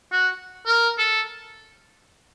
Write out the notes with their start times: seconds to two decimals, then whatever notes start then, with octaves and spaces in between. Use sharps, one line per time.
0.12 F#4
0.66 A#4
0.98 A4